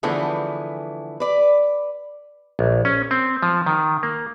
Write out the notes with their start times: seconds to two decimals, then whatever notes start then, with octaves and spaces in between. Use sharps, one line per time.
0.03 D3 E3 F3 A3 B3 G#4
1.20 B4 D5
2.59 A#1
2.85 C#4
3.11 C4
3.43 F3
3.66 D#3
4.03 A#3